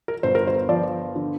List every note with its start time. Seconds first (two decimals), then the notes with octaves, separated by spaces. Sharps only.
0.08 A#4
0.23 G1 C5
0.35 A#4
0.47 C5
0.69 F3 D5
1.15 D3